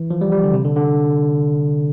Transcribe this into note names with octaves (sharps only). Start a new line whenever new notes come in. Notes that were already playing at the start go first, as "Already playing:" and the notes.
Already playing: E3
F3
G3
G3
D3
C3
D3
D3